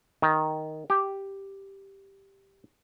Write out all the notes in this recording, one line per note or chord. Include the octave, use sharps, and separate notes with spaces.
D#3
G4